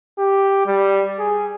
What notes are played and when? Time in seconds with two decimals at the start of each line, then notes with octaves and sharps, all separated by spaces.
0.18 G4
0.66 G3
1.19 G#4